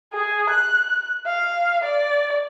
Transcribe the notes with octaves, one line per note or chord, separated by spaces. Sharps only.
G#4
F#6
F5
D5